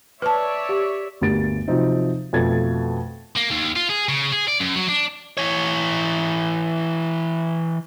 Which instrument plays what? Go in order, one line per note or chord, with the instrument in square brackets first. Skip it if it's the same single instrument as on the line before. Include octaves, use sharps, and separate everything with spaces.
[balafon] B4 A5 [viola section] C#5 D5 E5
[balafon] G4
[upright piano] G1 D2 A#3 G4 A6 D7
C3 F3 F#3 C4 D#4
F2 B2 A3 G#6 A6
[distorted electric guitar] A#3
D#2
F4
G#4
C#3
G#4
D5
F#2
F#3
D4
[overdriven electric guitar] E3 C#5